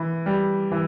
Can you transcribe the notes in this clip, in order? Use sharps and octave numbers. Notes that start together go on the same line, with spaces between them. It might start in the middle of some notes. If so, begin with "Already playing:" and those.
Already playing: E3
G3
E3